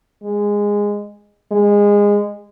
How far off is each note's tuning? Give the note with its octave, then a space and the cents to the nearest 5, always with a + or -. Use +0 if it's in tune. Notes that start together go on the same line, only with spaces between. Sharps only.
G#3 -15
G#3 -20